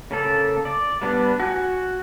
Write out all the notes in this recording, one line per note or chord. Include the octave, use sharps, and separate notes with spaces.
C#3 A#3 A4
D5
G3 B3 D4
F#4 G#5